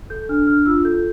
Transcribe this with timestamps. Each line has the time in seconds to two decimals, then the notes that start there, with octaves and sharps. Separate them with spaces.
0.10 A4 G6
0.29 D4 F6
0.47 D4 F6
0.66 F4 E6
0.85 A4 G6